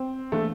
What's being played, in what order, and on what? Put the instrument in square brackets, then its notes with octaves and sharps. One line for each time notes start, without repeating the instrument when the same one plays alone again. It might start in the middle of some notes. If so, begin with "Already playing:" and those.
Already playing: [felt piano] C4
[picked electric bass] E3 A#3 D4 [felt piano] A3